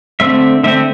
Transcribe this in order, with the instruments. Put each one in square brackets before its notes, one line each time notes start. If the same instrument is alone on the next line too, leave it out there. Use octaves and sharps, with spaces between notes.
[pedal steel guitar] D3 A3 C4 E5
D3 A3 C4 E5